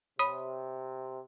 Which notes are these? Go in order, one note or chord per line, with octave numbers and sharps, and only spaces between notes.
C3 C#5 B5 D#6